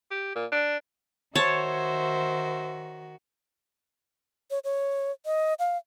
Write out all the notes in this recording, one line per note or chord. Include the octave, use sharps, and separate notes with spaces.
G4
A#2
D4
D#3 F#4 C5 C#5 E5 A5
C#5
C#5
D#5
F5